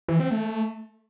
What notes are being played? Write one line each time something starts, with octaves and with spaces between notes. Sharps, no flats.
E3
C4
A3